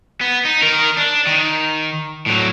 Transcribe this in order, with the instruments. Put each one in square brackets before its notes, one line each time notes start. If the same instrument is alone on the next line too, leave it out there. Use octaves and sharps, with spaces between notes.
[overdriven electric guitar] B3
D#4
D#3 A#4
D4
D#3
A2 F#3